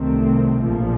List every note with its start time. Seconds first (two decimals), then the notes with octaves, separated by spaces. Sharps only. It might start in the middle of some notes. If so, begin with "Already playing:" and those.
Already playing: C2 C3 D#3 A3 C4
0.61 A#1 A#2 F3